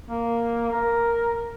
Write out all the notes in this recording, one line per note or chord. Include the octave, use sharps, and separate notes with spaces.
A#3
A#4